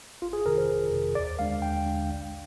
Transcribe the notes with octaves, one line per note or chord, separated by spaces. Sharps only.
G1 F4
G#4
F2 C3 D#3 A#4
C5
G1
F2 C3 D#3
D#2 D5
D3 G#3 D4 F5
D#2 G5
D3 G#3 D4
A#1